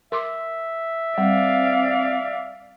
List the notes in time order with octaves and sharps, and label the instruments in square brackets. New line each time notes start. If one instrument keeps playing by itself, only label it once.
[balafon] A#4 C6 D6 [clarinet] E5
[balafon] G3 [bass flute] C4 [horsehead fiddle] D5 F5